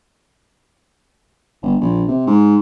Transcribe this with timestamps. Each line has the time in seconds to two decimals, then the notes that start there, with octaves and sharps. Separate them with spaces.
1.63 G1
1.81 A#1
2.08 C3
2.27 G#2